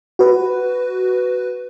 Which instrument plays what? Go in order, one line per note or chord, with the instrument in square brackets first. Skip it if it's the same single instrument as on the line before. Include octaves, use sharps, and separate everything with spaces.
[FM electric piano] F#4 B4